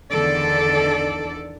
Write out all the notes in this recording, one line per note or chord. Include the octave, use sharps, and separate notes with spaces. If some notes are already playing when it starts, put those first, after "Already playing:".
E2 D3 D#3 A4 D5